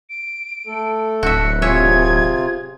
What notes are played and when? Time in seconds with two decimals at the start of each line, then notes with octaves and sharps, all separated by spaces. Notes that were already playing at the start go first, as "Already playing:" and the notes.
0.09 D7
0.67 A3 A4
1.23 D1 F#4 E5 C#7
1.62 C3 F4 G#4 C#5 E5 G#6